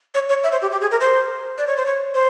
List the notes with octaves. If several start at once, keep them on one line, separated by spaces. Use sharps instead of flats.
C#5
C#5
E5
C5
G4
G4
G#4
A#4
C5
D5
C#5
C5
C#5
C5